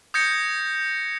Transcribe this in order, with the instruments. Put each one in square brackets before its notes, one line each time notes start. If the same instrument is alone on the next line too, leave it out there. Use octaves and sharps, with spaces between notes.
[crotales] D#6 G6 G#6 A#6 C#7